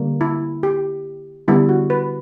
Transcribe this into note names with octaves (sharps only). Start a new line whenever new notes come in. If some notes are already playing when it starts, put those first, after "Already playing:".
Already playing: D3 G3 A#3
E4
G4
D3 G3 B3 E4
F#4
B4